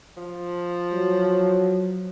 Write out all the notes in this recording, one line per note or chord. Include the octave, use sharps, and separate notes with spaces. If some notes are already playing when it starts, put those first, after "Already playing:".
F3
F#3